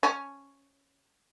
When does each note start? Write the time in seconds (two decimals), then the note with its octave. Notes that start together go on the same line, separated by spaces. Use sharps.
0.03 C#4